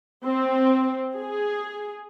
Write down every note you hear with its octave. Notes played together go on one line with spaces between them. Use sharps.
C4
G#4